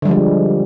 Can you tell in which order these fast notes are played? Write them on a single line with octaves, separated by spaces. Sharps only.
D3 G3 F3 G#3